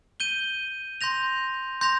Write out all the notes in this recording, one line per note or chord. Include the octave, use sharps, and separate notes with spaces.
G6 D#7 G7
C6 G6 A#6 F7
C6 G6 A#6 F7